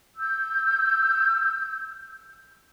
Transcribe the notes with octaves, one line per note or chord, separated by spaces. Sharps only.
E6 G6